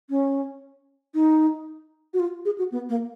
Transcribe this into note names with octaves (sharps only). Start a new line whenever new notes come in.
C#4
D#4
F#4
F4
G#4
F#4
B3
A#3